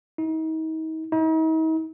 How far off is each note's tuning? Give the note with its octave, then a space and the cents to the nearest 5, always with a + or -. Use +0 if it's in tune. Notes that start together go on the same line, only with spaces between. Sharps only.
D#4 +40
D#4 +45